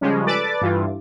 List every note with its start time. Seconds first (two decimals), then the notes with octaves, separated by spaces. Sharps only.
0.01 C#3 F3 G3 G#3 C#4
0.26 A4 B4 D5 A5 D6 A6
0.62 G2 E3 F4